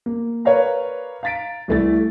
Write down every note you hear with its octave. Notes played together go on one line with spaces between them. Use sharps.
A#3
A#4 B4 C#5 D5 F5 A#5
F5 A#5 A6 B6 D7
C2 E3 A3 E4 A6